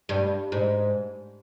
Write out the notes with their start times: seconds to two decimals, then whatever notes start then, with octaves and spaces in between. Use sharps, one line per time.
0.09 G2
0.52 G#2